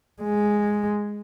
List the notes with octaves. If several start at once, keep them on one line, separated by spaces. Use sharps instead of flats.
G#3